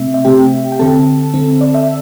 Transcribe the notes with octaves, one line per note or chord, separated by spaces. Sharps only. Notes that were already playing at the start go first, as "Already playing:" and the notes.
Already playing: C3 A3 C4 E5
E5
C3 A3 C4 G4 G5
G5
D3 C4 A4 A5
D3 C4
D5
E5